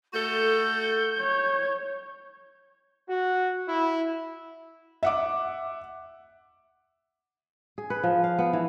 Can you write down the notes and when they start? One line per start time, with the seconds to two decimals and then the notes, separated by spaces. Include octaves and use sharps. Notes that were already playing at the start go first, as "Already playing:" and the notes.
0.14 A3 F#4 A4 G6
1.20 C#5
3.09 F#4
3.68 E4
5.03 E5 F#5 D6
7.78 G#4
7.90 B4
8.03 F3
8.24 F5
8.39 B3
8.53 E3